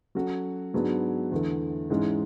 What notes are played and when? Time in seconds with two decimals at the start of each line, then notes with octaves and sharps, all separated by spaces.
0.15 F#3 C#4 F#4 A4
0.74 G#2 F#3 B3 D4 G#4
1.32 E2 D3 A3
1.90 G#2 E3 G#3 C#4